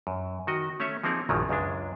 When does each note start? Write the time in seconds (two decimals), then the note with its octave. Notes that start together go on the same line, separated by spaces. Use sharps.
0.07 F#2
0.47 D#3 F#4 D#5
0.80 A3 C#4 C#5 E5
1.04 F3 A#3 C4 D#4 G#4 A#4
1.29 A#1 F#2 D#3 F3 F#3 G#3
1.49 C#2 F#2 G#3 D4